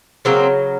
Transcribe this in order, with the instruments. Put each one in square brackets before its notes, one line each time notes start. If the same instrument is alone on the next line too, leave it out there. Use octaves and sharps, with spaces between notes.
[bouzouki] C#3 F#3 A#3 C4